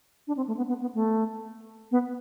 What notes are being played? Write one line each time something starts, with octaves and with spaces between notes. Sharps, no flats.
D4
C4
A3
B3
B3
B3
A3
B3